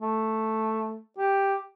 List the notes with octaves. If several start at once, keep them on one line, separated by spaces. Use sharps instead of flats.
A3
G4